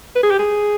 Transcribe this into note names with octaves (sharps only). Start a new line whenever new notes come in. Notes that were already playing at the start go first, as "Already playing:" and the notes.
B4
G#4
G4
G#4